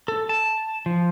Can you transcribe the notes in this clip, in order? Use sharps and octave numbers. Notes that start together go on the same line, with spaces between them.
A4
A5
F3